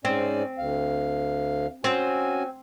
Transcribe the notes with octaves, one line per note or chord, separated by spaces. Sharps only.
G#2 C4 C#4 D5
D2 F5
C4 C#4 F#4 G#5